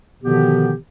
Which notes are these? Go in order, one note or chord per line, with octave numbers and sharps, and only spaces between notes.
B2 D3 D#3 F3 B3 G4